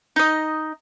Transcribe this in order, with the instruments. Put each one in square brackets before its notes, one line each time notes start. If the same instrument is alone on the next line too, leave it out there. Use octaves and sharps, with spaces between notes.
[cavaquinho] D#4 D#5